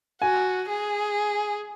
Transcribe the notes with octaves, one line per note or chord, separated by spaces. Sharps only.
F#4 G#5
G#4